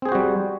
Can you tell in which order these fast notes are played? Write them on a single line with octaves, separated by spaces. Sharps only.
C4 G#4 C5 F#4 G3